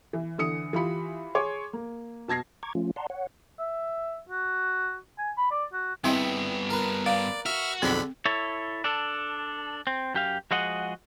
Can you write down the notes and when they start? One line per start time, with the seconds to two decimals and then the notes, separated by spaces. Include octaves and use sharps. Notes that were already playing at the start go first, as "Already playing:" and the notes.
0.13 E3
0.38 D3 E3 D#6 C#7
0.73 E3 F4 G4 B5 C#7
1.35 G#4 C#5 C6 D6
1.73 A#3
2.28 B2 A5 G#6 A#6 C7
2.63 A#5 C#6 D6 G#6
2.75 F3 A3 C#4 F4
2.96 D5 F#5 A5 A#5 C6
3.10 C#5 F#5
3.59 E5
4.29 F#4
5.18 G#5
5.38 B5
5.51 D5
5.73 F#4
6.04 G2 B3 C4 E4 G#4 D#5 E5 G5
6.70 A#4 B4
7.06 D5 F5
7.46 F#4 E5 F6
7.82 B1 F2 D3 C4 D4 G#4 B5
8.25 E4 A4 C#5
8.84 D4 A4
9.87 C4
10.14 F#2 G4 F5
10.51 F3 G#3 F#4 G#4 D#5 F#5